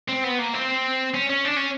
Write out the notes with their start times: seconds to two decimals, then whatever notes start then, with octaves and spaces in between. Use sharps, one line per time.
0.09 C4
0.24 B3
0.40 A#3
0.54 C4
1.14 C#4
1.29 C#4
1.45 D4
1.56 C#4